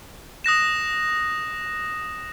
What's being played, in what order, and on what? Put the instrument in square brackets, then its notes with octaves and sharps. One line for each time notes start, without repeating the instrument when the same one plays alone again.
[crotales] D#6 F#6 A#6 E7